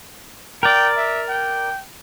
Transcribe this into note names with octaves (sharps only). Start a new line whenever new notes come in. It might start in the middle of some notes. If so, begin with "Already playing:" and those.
A#4 D5 G5
E5
G5